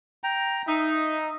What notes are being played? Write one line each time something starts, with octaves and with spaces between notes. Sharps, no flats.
G5 A#5
D#4 E5